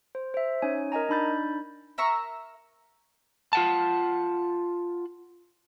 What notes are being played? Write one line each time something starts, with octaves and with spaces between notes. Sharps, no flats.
C5
C5 E5
C#4 D#4 C#5 G#5
A#4 D#5 G#5 A#5
D4 D#4 B5 G6 A6
A#4 E5 A#5 C#6
F4 F#5 A5